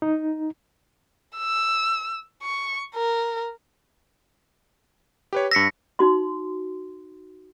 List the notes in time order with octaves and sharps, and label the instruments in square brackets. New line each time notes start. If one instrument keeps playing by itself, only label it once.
[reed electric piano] D#4
[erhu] E6
C#6
A#4
[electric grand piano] G4 B4 C#5
[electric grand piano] G2 E6 [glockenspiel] A#6 B6 C#7
[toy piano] D#4 F#4 C6